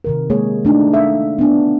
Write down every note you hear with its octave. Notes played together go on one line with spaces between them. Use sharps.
C3 D#3 A#4
G#3 A#3 G#4 C#5
A3 D4 D#4
A4 E5 F5
B3 D4